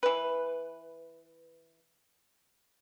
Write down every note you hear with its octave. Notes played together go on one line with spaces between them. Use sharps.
E3 B4